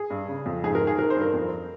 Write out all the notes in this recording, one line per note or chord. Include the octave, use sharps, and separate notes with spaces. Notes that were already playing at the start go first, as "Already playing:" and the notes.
Already playing: G#4
G2
C#3
F2
G#2 G#4
A#4
D#3
G#4
D#3 A#4
C5
G2 A#4
F2